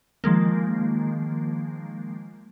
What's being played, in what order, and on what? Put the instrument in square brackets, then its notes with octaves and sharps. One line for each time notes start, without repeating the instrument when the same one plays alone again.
[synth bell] D#3 F3 G#3 A#3